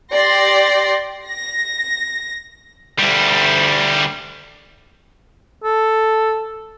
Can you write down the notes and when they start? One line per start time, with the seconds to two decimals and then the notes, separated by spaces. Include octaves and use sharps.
0.12 G4 D5 C6 A#6
1.25 A#6
2.99 D2 G3
5.64 A4